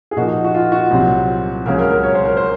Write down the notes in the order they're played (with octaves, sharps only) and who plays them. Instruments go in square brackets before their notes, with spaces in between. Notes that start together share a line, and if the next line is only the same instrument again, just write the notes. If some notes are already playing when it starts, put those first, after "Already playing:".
[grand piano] G#4
A#2 F3 A#3 D#4 F#4
F#4
F4
F#4
C2 A#2 F#3 C4
C#2 C#3 F#3 A#3 C#4 A#4
A#4
A#4
C#5
C5
A#4
C5